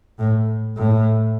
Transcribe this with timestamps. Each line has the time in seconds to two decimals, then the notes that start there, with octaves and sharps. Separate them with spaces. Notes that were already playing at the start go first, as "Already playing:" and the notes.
0.19 A2
0.77 A2